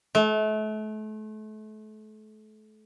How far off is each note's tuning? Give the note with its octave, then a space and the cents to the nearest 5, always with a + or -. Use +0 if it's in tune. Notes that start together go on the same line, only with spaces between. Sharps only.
A3 -35